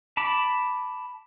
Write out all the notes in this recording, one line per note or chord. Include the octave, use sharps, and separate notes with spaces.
A5 B5 D6